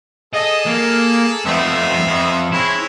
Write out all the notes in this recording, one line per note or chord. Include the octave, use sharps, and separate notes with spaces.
G#4 A4 D#5
A#3
F2 A3 B3 C4 E5
F2
G#3 C4 C#4 E4